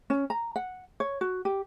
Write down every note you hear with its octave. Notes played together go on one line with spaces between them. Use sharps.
C#4
A#5
F#5
C#5
F#4
G4